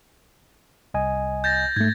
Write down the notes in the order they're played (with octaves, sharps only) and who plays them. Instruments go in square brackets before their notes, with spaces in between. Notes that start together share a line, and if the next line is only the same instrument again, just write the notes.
[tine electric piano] C2 D#5 G#5
[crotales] G6 A6 A#6
[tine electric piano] G#2 A3 [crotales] G#6